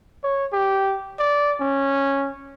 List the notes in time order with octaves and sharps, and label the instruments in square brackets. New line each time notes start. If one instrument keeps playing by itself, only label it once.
[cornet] C#5
G4
D5
C#4